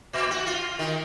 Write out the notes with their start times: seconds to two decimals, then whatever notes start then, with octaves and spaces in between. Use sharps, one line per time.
0.13 A#2
0.31 F#4
0.47 F4
0.79 D#3